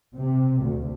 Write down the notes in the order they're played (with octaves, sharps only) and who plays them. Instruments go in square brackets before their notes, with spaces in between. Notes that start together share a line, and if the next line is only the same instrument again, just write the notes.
[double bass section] C3
D2